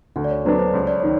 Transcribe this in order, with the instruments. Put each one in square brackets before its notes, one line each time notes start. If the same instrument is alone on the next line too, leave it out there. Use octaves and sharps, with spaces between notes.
[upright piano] D2 [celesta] F#5
[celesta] D5
C#5
[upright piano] D3 F#3 B3 D4 [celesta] C5
[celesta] C5
[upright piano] C#2 [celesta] C#5
[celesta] D5
[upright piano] D#3 [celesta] C#5